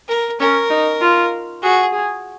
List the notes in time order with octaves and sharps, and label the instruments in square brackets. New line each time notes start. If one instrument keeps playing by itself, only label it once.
[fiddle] A#4
[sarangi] C#4 [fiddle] A#4
[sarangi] D#4
F4
[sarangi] F#4 [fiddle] G#4
[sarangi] G#4